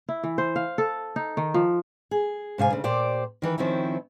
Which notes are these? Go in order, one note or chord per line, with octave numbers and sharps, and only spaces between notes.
E4
E3
C5
F5
A4
D#4
D#3
F3
G#4
G#2 C3 F5 G#5
D2 C#3
A#2 G4 C5 D5
D#3 E3 B4
D#3 F3 C4 C#4 E4